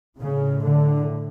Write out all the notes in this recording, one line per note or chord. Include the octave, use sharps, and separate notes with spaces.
A2 C#3
D3